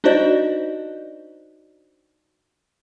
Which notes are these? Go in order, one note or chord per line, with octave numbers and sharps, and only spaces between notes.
D4 D#4 F#4 C5 D5 D#5